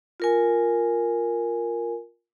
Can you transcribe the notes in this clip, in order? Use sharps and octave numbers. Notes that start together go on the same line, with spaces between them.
F4 A#4 G#5